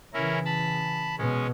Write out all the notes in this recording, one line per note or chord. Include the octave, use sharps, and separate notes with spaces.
C#3 E3 C#4 E4 A#4
A5 B5
B2 G#3 C#4